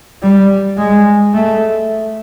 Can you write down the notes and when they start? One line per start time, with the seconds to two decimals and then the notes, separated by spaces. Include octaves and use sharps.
0.23 G3
0.78 G#3
1.34 A3